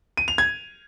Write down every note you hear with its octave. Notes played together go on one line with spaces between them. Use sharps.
D#7
F7
G#6